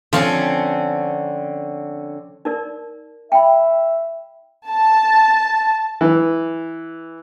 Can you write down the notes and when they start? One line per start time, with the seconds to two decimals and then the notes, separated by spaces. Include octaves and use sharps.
0.13 D3 F3 C4 C#4
2.45 D#4 A#4 D5
3.32 E5 G5 B5
4.69 A5
6.01 E3